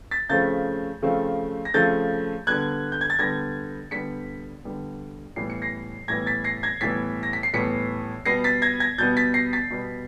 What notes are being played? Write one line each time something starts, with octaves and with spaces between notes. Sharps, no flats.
A6 B6
C#3 F3 A3 C4 G6 A6
C#3 F3 A3 C4
A#6
C#3 F3 A3 C4 G6 A6
D3 G3 B3 F#6 G#6
G6
G#6
A6
D3 G3 B3 G#6 A#6
D3 G3 B3 B6 C#7
D3 G3 B3
A2 E3 G3 B3 C7
C#7
A#6 C7
A2 E3 G3 B3 G#6 A#6
A6 B6
A#6 C7
G#6 A#6
A2 E3 G3 B3 A6 B6
A#6
B6
C7
A2 E3 G3 B3 B6 C#7
B2 G3 B3 A#6 C7
A6 B6
G#6 A#6
G#6 A#6
B2 G3 B3 G6 A6
A6 B6
A#6 C7
A6 B6
B2 G3 B3